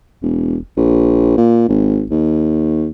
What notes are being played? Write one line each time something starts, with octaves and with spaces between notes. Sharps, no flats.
E1
A#1
A#2
G#1
D#2